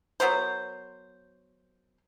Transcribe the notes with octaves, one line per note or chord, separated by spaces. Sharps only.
F#3 B3 A#4 C5